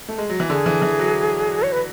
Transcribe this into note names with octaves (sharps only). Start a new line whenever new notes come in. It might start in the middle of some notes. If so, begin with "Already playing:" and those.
A3
G#3
F#3
E3
D3 G#4
E3
E3
F#3
C#5
B4